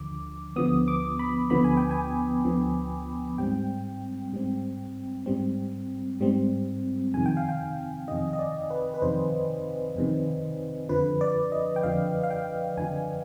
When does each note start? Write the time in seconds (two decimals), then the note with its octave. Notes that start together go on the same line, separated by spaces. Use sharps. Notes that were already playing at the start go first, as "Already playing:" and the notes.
Already playing: D2 D3 F3 D6
0.56 D2 D3 F3 B3 D#6
0.88 D6
1.19 B5
1.50 D2 D3 F3 B3 B5
1.64 G#5
1.77 G5
1.91 G#5
2.44 D2 D3 F3 B3
3.38 G#2 G3 C4 G5
4.32 G#2 G3 C4
5.26 G#2 G3 C4
6.20 G#2 G3 C4
7.14 F2 C3 D#3 G#5
7.26 G5
7.37 F5
7.49 G5
8.08 F2 C3 D#3 D#5
8.33 D#5
8.39 D5
8.70 B4
8.94 B4
9.02 F2 C3 D#3 C5
9.96 F2 C3 D#3
10.89 F2 D3 F3 B4
11.21 D5
11.52 D#5
11.76 G5
11.83 F2 D3 F3 F5
12.24 F5
12.31 G5
12.78 F2 D3 F3 G#5